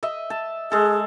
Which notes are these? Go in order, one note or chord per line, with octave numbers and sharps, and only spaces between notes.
D#5 E5
A5
G#3 G#4 A4